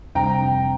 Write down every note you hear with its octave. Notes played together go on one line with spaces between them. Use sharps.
F2 C3 G3 C4 G5 A#5